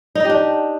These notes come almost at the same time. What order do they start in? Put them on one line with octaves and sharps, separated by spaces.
D#4 D#5 G4 D4